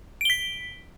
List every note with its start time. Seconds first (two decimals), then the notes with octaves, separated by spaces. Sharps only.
0.21 D7
0.25 G7
0.30 B6